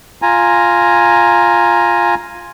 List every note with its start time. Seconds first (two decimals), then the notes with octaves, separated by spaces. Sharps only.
0.22 F4 G#5 A#5